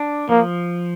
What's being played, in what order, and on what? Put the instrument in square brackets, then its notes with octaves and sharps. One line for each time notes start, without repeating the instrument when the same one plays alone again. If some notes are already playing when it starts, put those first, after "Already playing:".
Already playing: [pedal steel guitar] D4
[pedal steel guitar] F3 [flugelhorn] A#3